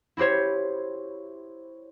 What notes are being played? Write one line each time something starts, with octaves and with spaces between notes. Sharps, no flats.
E4 F#4 G4 C5 C#5